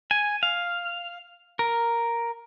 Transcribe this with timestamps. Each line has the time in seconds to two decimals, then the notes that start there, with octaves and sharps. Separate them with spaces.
0.11 G#5
0.43 F5
1.59 A#4